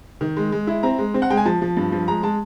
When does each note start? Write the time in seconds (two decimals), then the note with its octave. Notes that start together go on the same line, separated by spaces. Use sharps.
0.21 D#3
0.37 G#3
0.52 G#3
0.67 E4
0.83 C4 A#5
0.98 G#3
1.14 C4
1.22 F#5
1.30 G#3 G5
1.37 G#5
1.45 F3 A5
1.62 F3
1.77 G2
1.92 F3
2.08 G#3 A#5
2.23 G#3 A5